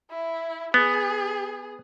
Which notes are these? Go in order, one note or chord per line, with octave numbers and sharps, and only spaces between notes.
E4
B3 G#4